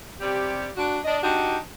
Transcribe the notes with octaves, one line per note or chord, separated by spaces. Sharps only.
C3 G3 G4
D4 F#4
D4 D#5
D4 D#4 F#4 G4